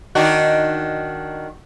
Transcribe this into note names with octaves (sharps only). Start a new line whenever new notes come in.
D#3 D4 F#4